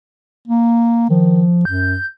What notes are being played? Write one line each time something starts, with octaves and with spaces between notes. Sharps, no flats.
A#3
D#3 F3
F#2 G6